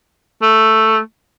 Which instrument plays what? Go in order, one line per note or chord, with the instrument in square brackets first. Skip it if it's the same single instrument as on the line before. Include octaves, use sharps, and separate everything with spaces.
[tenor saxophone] A3